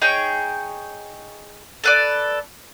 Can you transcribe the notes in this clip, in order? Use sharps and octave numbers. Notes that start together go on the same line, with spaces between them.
D#4 G#4 C#5 G5
A4 B4 D5